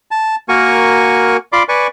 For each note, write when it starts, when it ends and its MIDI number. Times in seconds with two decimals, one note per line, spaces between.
0.11 0.36 81
0.49 1.37 58
0.49 1.37 66
0.49 1.37 70
0.49 1.37 80
0.49 1.37 85
1.53 1.63 65
1.53 1.63 74
1.53 1.63 83
1.53 1.63 84
1.53 1.63 86
1.69 1.87 71
1.69 1.87 74
1.69 1.87 80
1.69 1.87 85